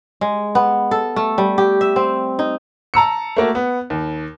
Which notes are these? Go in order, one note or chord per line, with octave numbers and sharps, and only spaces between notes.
G#3
B3
A4
A3
G3
G4
E5
C4
D#4
A5 A#5 E6 C#7
A3 A#3 F#4
B3
D#2